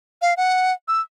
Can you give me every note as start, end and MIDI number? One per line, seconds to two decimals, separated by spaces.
0.22 0.34 77
0.37 0.73 78
0.88 1.01 88